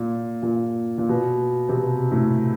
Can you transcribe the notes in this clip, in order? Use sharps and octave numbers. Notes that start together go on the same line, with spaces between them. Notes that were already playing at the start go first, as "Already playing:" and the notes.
Already playing: A#2
A#2
A#2
B2
C3
B2
A2